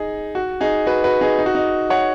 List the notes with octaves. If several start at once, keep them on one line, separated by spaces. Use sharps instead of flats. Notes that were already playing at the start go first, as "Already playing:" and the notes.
Already playing: D#4 G#4
F#4
D#4 G#4
F#4 B4
F#4 B4
D#4 G#4
D#4
F#4
D#4
C#5 F#5